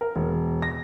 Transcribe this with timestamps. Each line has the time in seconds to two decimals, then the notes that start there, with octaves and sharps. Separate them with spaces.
0.01 A#4
0.16 E1
0.62 A#6